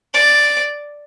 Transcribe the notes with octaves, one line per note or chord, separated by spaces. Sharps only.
D5